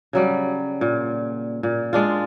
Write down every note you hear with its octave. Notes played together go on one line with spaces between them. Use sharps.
C#3 F#3 G3
A#2
A#2
G#3 D4 F4